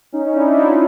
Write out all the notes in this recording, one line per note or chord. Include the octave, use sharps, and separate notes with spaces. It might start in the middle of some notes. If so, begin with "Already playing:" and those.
C#4 D#4
D#4
D4 E4
D#4 F4